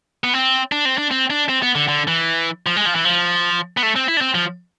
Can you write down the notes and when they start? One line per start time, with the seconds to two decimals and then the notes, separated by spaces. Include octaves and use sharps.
0.24 B3
0.34 C4
0.72 D4
0.85 C4
0.98 D4
1.11 C4
1.30 D4
1.49 C4
1.62 B3
1.75 D3
1.88 D3
2.08 E3
2.66 F3
2.76 G#3
2.86 F3
2.95 E3
3.05 F3
3.77 B3
3.83 A3
3.96 C4
4.08 E4
4.17 D4
4.21 C4
4.35 F3